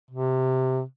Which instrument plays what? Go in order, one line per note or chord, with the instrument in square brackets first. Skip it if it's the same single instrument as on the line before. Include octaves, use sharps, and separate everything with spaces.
[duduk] C3